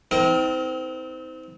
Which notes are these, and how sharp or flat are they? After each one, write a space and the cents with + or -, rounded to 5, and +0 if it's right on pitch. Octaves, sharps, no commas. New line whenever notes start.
C4 -25 D#4 +45 A#4 +5